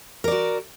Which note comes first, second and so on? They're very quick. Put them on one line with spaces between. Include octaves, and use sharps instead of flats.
A#4 D5 F#4